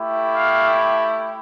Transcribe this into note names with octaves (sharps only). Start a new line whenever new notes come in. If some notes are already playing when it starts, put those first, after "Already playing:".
Already playing: A3 E4 G4
F5